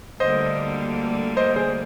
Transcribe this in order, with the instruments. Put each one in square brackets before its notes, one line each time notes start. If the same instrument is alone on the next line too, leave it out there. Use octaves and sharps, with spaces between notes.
[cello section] D2 D3 G3 A#3 [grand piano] C5 D#5
[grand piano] C5 D#5
G#4 C5